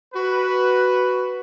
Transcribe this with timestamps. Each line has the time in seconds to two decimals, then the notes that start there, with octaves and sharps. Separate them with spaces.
0.14 F#4 B4